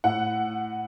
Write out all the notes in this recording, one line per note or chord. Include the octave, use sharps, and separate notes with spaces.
A2 F#5